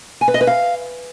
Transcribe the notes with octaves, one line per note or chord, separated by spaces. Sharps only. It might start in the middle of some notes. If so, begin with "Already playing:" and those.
G#5
B4
D#5
B4
F5